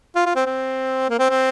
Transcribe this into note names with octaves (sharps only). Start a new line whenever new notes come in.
F4
F4
C4
C4
A#3
C4
C4